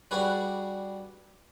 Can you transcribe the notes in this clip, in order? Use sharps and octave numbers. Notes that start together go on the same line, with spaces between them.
G3 D4 F#4 G#4 B4